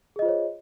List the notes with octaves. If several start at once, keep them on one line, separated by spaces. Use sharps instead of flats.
F4 G#4 C5 C#5 D#5